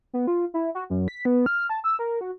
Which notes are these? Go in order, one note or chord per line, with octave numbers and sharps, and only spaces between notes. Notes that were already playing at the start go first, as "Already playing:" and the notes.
B3
F4
E4
F#4
F#2
B6
B3
F6
A5
E6
A#4
F#4